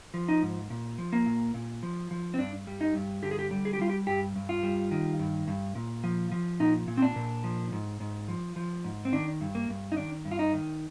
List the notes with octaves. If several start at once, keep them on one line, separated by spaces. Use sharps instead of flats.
F3
D#4
G#2
A#2
F3
A#3
A#2
A#2
F3
F3
C4
G2 D4
G3
D#4
G2
D3 G4
G#4
G4
G3
G#4
G4
G3 F4
G4
G2 G4
G2
F4
G3
D#3
G2
G2
A#2
F3
F3
A#2 D#4
A#2
C4
D4
A#2
F3
G#2
G#2
F3
F3
G#2
C4
D#3 D4
G2
A#3
G2
D#4
D#3 D4
G2
F4
D#4
D#3